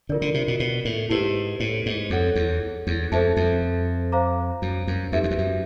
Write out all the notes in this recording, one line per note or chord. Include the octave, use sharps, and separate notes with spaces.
D3 F4 A#4 D5
D3
C3
B2
B2
A2
G#2 E4 G4 B4
A2
G#2
F2 A4 C#5 F#5
E2
E2
F2 A4 C5 E5 A5
F2
C5 F5 A#5 D6
F#2
F#2
F2 D#4 G4 B4 E5
E2
F2
F#2